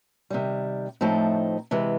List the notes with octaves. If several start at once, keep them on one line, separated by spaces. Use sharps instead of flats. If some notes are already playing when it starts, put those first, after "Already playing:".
C3 D#3 G3
A2 F3 A3 C4 D#4
C3 E3 G#3